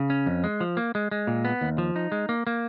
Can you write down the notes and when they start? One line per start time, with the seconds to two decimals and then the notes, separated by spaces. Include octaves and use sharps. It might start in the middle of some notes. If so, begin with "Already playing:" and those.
Already playing: C#3
0.10 C#4
0.26 F2
0.44 G#3
0.61 F3
0.77 A#3
0.95 G#3
1.11 G#3
1.27 A#2
1.45 B3
1.61 D#2
1.78 F3
1.96 D#4
2.12 G#3
2.29 A#3
2.47 A#3